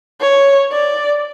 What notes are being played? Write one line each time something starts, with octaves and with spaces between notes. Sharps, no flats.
C#5
D5